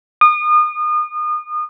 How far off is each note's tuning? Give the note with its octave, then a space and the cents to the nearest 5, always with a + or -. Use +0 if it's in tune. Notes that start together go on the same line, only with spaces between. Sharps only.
D#6 -35